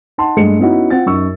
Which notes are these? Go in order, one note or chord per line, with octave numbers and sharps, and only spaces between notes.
D#4 F#5 A5 C6
G2 G#3 A3 C#7
B3 C#4 D#4 E4 F#4
C4 F4 F#5 A6
F#2 D#4 C#6 E6